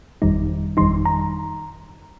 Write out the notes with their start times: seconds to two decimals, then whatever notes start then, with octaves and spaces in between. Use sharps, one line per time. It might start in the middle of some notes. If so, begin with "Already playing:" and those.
0.22 G1 F2 D#3 G3 D#4
0.77 G1 F2 D#3 G3 D#4 C6
1.05 A#5